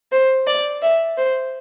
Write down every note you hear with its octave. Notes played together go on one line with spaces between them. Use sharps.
C5
D5
E5
C5